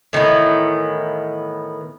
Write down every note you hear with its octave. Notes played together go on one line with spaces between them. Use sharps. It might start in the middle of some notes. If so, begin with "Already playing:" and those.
A2 D#3 E3 B3